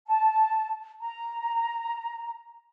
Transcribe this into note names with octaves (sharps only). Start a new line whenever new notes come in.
A5
A#5